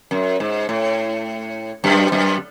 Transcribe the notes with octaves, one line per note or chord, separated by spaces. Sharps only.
F#2
G#2
A2
F#2
F#2